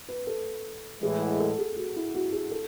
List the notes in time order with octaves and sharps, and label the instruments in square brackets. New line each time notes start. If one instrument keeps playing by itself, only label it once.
[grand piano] B4
A4
[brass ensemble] A2 E3 G#3 [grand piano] G#4
[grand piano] F#5
A4
G#4
F#4
E4
F#4
G#4
A4